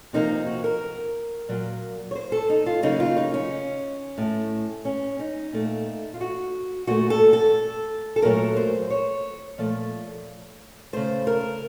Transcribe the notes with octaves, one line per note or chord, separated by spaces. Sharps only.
C3 F3 A#3 D#4
F#4
A#4
A#2 F#3 A#3
C#5
C5
A4
D#4
F4
C#3 F#3 A#3 D#4
F4
D#4
C#4
A2 A3
C#4
D#4
A#2 A3
F4
F#4
A#2 A3 F#4
A4
A4
A4
A#2 F#3 A3 A#4
C5
C#5
A#2 F3 A3
C#3 A3 C5
A#4